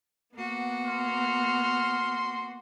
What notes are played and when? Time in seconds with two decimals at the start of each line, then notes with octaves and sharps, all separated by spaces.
0.35 A#3 B3 F#4
0.86 C6 F6